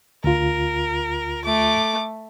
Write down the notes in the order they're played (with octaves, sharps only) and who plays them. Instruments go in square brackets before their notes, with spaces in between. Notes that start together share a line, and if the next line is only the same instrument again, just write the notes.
[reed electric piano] D2 F4 [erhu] A#4
[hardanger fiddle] A3 [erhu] D6